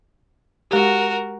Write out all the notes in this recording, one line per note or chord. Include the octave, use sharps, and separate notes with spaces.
G#3 F#4 G4 A#4